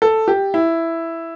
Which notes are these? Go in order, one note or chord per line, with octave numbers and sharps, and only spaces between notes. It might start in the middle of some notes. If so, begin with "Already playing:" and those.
A4
G4
E4